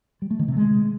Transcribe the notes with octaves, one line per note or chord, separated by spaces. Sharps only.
G3
A3
D#3
C3
G#3